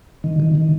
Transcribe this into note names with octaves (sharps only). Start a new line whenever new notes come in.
D#3
D#3
D#3